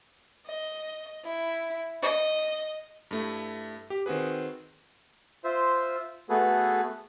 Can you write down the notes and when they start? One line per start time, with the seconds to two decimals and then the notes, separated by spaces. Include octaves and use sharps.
0.46 D#5
1.24 E4
2.02 D#5
3.11 G2 A3 E4
3.90 G4
4.06 D#3 C4 F#4 G#4 B4
5.44 F4 C5 E5
6.30 A3 B3 F#4 G#4 A4 B4